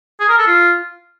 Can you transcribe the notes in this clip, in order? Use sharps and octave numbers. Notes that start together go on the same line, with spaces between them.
G#4
A#4
A4
F4